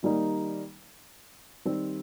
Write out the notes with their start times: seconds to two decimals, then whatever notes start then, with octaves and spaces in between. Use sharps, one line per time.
0.03 D#3 G3 A#3 D#4
1.65 D#3 G3 C4